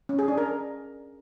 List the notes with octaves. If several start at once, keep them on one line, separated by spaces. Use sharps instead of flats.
C#4
G#4
D4
A#4